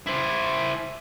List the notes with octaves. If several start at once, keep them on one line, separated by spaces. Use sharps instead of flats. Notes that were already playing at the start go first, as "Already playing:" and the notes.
E4 C5